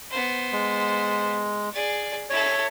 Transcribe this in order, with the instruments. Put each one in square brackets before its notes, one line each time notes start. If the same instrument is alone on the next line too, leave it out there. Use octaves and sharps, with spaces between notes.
[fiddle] B3 C5
[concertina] G#3
[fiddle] G#4 D5
[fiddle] E4 A4 [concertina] C#5